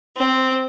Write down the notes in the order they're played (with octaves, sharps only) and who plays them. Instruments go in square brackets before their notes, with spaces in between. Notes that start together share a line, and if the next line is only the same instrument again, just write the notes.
[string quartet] C4